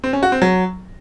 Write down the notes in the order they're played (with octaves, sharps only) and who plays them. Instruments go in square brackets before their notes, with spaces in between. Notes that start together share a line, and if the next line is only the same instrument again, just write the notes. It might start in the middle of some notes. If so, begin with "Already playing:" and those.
[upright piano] C4
C#4
F#4
C4
F#3